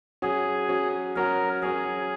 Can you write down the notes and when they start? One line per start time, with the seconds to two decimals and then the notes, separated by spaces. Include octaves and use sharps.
0.22 F#3 C#4 F#4 G#4
0.69 F#3 C#4 F#4
1.16 F#3 C#4 F#4 A#4
1.62 F#3 C#4 F#4 G#4